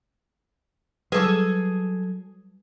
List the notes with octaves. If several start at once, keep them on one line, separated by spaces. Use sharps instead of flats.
F#3 G3 G#4 A4 B4 D6 E6